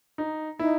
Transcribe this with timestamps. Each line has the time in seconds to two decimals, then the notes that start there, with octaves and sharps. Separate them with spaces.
0.18 D#4
0.59 D#4 E4